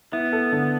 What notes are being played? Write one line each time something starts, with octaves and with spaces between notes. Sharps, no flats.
B3 E4
A4
D3